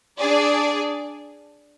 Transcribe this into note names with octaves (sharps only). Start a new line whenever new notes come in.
D4 G#4 D5